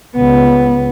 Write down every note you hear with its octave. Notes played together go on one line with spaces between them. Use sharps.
C#2 B3